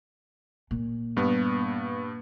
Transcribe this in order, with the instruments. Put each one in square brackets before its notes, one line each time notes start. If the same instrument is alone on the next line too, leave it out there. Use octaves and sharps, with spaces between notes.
[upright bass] A#2
[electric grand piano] G2 B3